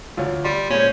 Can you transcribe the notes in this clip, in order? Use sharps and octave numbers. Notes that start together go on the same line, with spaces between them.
D2 F4 C#5
G3 D5 C6
A#2 G#3 C#4 C5 C#5